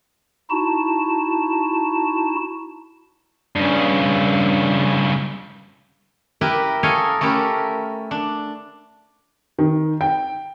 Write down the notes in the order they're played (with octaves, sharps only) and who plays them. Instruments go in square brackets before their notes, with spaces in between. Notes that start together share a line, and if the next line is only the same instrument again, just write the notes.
[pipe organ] D#4 E4 F#4 A5
[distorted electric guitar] G2 C#3
[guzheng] E4 G4 A#4 B4
A4 A#4 C#5 D#5 F5 G#5
A3 C#4 E4 G4 A#4
D4
[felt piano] D#3
G5